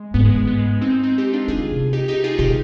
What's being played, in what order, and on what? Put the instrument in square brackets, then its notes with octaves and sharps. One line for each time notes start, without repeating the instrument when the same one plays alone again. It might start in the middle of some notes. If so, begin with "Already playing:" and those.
Already playing: [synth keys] G#3
[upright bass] G#2 [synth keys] B3
[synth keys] G#3
[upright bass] G#2
[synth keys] B3
G#3
C4 D#4
C4 D#4
D#4 G4
D4 F4
[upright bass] D3 [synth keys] F4 G#4
[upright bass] C3
[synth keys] D#4 G4
D#4 G4
F4 G#4
[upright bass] B2 [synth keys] D#4 G4